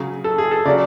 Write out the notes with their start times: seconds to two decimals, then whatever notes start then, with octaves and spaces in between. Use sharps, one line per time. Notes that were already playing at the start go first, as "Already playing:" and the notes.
Already playing: C#3 F#3 G#4
0.24 A4
0.38 G#4
0.51 A4
0.65 C#3 F#3 D5